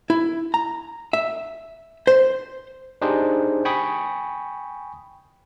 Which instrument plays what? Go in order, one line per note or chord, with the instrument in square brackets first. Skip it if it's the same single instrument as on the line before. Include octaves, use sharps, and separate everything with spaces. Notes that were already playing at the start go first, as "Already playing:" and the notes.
[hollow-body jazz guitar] E4
A#5
E5
C5
[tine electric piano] D4 D#4 G4 G#4 C5
G5 G#5 B5 C#6 D#6